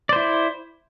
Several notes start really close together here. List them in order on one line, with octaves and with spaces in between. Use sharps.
D5 C5 E4